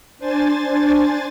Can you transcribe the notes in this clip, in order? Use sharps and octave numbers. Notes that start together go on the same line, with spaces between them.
D4 C5 G#5 A6